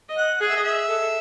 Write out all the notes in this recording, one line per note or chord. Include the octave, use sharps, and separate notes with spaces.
D#5
F#5
G#4 F#5
E5
D#5
E5
A4